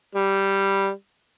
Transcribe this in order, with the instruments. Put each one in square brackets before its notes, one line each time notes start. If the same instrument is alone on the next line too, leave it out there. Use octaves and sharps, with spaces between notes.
[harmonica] G3